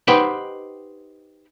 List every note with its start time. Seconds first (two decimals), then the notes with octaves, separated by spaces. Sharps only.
0.08 D#4 G4 B4 C5 F#5 G5